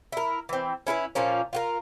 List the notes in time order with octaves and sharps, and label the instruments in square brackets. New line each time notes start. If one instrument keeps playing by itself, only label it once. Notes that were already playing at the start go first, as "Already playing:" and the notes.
[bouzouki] E4 A#4
E3 C4
C#4 E4 A#4 B4
A#2 F3 A#3 C#4
F4 F#4 A#4